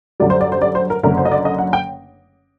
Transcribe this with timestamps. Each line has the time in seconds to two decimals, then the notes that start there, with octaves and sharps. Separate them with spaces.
0.20 F#2 D3 G3 D5
0.30 C5
0.41 D5
0.52 C5
0.62 D5
0.75 C5
0.90 A#4
1.03 F#1 F#2 D3 A#4
1.17 C5
1.25 D#5
1.32 D5
1.45 D#5
1.58 F#5
1.73 G5